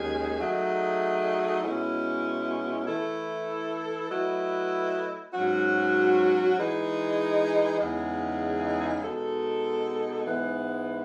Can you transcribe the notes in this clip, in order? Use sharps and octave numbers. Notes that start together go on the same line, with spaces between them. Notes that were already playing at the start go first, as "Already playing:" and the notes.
Already playing: D#2 D#3 G#3 C#4 G#4
F#3 A3 D#4 G#4 D#5
B2 G#3 C#4 E4
E3 A3 E4 A4
F#3 A3 E4 B4 D#5
G#2 F#3 C#4 F#4
E3 G#3 D#4 G#4
E2 C#3 G#3 D#4 G#4
B2 G#3 D#4 A4
G#2 E3 G#3 B3